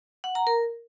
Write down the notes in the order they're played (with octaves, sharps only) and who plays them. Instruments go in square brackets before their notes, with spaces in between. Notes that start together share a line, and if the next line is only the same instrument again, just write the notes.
[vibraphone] F#5
A#5
A#4